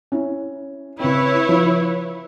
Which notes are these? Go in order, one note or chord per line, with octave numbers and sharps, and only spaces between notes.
C#4 E4
C#3 C4 E4 B4 C#5
F3